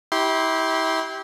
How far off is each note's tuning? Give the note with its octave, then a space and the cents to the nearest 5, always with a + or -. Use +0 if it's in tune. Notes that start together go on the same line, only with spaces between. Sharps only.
E4 -30 G4 -10 C6 +0